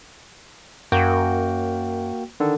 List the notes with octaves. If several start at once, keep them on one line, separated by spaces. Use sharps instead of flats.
F#2 A#3 F#4 G5
D3 D#3 A4